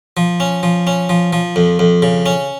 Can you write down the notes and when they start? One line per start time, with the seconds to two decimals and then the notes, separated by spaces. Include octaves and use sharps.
0.17 F3
0.40 C#4
0.63 F3
0.87 C#4
1.09 F3
1.33 F3
1.56 F2
1.79 F2
2.02 C#3
2.26 C#4